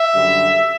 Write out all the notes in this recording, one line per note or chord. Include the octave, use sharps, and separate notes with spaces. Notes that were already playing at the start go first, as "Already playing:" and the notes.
Already playing: E5
F#2 D3 G3